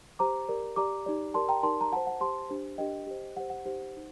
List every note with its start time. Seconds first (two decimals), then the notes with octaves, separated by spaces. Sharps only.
0.19 G4 C5 A#5 D6
0.49 G4 A#4 D5
0.76 G4 D5 A#5 D6
1.06 D#4 G4 D5
1.34 G4 A#4 D5 A5 C6
1.49 G5 A#5
1.63 D#4 G4 A#4 D5 A5 C6
1.81 A#5
1.92 F#4 C5 F#5 A5
2.07 F#5
2.21 G4 C5 A5 C6
2.50 D4 G4 C5
2.78 D4 G4 A#4 D#5 G5
3.07 G4 C5
3.37 G4 C5 F#5
3.50 F#5
3.65 D#4 G4 C5
3.94 D#4 F#4 C5